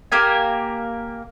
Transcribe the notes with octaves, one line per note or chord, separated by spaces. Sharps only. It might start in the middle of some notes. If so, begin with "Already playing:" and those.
A#3 G4 A#4 G#5